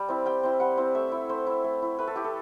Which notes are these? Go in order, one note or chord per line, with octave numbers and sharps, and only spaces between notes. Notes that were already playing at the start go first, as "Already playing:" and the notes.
Already playing: G3
C4 E4
G3 G5
C4 E4
G3 F#5
C4 E4
A3 E5
E4
A3 C5
E4
A3
E4
A3 B4
A4
E4 G4
A4